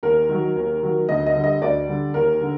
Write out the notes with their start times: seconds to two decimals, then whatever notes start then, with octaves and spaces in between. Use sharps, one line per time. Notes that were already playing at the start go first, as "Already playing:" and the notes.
0.03 D#2 A#4
0.29 D#3 F#3
0.56 D#2
0.83 D#3 F#3
1.09 D2 D#5
1.26 D#5
1.35 D3 G3
1.44 D#5
1.61 D2 D5
1.88 D3 G3
2.14 D#2 A#4
2.41 D3